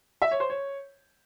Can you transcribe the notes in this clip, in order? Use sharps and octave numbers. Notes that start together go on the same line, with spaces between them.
E5
C#5
C5
C#5